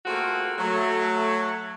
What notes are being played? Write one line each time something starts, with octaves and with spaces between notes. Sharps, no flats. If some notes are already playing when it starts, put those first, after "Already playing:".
A3 A#3 C4 F4 F#4 G#4
F#3 A3